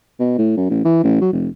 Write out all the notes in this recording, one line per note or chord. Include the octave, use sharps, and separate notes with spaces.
B2
A2
F#2
A1
E3
A1
F#3
F1